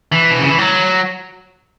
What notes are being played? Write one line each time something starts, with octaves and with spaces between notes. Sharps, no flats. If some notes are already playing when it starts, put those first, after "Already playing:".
E3
B2
C#3
E3
F#3